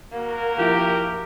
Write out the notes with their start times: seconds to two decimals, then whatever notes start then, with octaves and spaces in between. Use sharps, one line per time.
0.12 A#3 F#4 A#4
0.58 F3 E4 G4